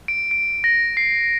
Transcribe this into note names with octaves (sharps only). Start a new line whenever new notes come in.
D7
D7
A#6
C7